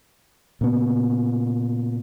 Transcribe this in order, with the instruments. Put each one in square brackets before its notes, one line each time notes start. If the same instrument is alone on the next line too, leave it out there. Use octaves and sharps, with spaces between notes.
[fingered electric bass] A#2 C#3 B3